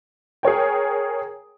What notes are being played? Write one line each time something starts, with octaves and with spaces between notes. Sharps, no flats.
G#4 A#4 C#5 G5